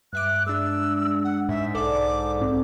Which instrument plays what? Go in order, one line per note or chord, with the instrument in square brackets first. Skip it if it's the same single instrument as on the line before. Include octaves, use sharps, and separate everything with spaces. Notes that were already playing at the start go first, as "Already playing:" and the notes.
[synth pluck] G2 E5 D6 [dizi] F#6
[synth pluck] G#3 D4 [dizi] E6
[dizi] F#5
[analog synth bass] G#2 [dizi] E5
[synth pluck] B1 A4 D5 [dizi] D6
[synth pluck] C#2 C4